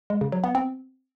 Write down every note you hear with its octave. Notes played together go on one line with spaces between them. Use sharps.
G#3
C#3
F#3
B3
C4